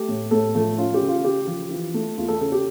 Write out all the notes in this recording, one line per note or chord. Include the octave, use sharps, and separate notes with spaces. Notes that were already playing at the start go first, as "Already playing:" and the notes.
Already playing: A3 G4
A2
A2 A3 A4
F3 A3 A4
C#4 F4
G4
C#3
F4
C#3 G4
F3
E3 F4
A3
E2 F4
A3 A4
C#3 A4
G4